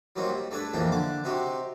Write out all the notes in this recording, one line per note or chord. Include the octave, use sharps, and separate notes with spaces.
F#3 G3 A#3 C4 D#4
G3
A3 D4 G#4 A4 B4
A#1 F2 E3 A#3 D4 G5
D3 D4 D6
C3 C4 D#4 F#4 G4